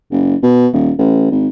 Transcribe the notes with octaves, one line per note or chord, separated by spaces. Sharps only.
F#1
B2
D#1
A1
G#1